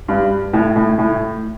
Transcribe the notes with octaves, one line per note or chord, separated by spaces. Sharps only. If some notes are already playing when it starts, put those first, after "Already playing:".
G2
A2
A2
A2